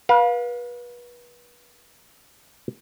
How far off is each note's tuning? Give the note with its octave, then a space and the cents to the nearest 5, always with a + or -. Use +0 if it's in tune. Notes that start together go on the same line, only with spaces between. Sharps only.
B4 -30 F5 +25